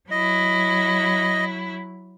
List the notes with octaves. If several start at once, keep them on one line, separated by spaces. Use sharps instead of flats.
F#3 E4 D#5